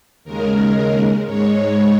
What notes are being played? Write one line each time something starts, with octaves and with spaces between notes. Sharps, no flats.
D#2 C#3 G#3 A#4
G#2 G#3 C#5